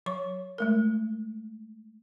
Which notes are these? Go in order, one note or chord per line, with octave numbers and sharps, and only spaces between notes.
F#3 C#5 C#6
G#3 A3 A#4